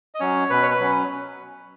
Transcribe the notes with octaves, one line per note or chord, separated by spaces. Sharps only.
D#5
F#3 C#4 C#5
B2 B4
C#5
B4
F#3 C#4